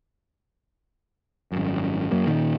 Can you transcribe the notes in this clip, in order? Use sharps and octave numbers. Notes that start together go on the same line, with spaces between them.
G#1 F#2
F#2 F#3 A#3
A#2 D#3